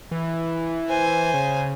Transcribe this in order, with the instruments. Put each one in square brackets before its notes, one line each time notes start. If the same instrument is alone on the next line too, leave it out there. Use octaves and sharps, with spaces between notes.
[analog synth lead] E3
[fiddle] C5 G#5
[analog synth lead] C#3